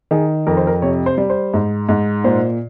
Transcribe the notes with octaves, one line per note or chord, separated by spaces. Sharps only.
D#3 G#4
F2 A#4
C5
A#4
C3 C#5
C5
G3
C5
G#2
G#2
A#2 C5